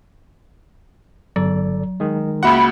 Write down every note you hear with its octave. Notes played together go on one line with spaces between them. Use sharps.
G1 F#3 A4 D5
D#3 G#3
C#2 A#3 F#4 E5 F#5 B5 C6